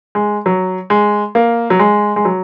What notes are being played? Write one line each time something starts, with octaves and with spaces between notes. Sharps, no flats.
G#3
F#3
G#3
A#3
F#3
G#3
G#3
F#3